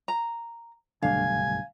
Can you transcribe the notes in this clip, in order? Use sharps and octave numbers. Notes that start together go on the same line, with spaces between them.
A#5
F#1 B1 G2 D3 A3 D4 F5 G#5